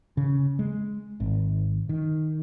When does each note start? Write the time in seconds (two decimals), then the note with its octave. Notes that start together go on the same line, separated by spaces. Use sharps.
0.17 C#3
0.59 G#3
1.20 G#1
1.89 D#3